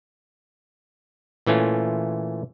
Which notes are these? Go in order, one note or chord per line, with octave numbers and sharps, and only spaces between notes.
A#2 E3 A3 C#4 F4